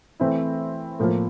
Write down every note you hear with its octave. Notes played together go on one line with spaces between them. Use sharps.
E3 A3 C4 E4
A2 F3 A#3